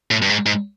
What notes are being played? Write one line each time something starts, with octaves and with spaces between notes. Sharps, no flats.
A2
G2
G#2
G#2